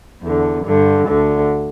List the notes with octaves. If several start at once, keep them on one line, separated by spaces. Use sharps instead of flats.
E2 D3
G2 D3
D2 D3